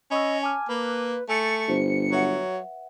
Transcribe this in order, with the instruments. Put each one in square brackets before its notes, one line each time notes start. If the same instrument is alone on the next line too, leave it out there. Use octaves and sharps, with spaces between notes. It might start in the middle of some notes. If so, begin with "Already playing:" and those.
[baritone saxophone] C#4 [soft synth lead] D#5 [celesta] B5 C#6 E6
[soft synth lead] G#5 [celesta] A5 D6 F6
[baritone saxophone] A#3 [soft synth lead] B4
[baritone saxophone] A3 [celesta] G#5 E6 A6 [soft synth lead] C#7
[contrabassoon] G1 [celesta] E4 G4 C5
[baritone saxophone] F#3 [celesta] B4 E5 F#5